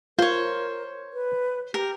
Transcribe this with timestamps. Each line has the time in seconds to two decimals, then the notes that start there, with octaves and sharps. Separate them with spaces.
0.19 F4 A#4 C5 C#5
1.13 B4
1.74 G4 A#4